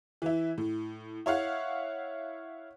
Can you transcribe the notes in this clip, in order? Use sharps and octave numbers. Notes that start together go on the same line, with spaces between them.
E3 E4
A2
E4 C#5 F5 F#5